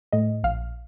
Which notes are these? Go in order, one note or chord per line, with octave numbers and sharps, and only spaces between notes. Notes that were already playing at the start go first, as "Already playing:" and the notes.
A2 D#5
A#1 F5